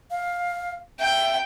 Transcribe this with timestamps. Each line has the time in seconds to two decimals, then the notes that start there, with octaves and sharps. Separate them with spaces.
0.11 F5
0.99 E5 G5